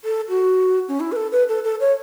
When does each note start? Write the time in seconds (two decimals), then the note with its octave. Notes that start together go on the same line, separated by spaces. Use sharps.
0.04 A4
0.29 F#4
0.88 C#4
1.00 E4
1.12 B4
1.16 A4
1.32 B4
1.49 A4
1.64 A4
1.80 C#5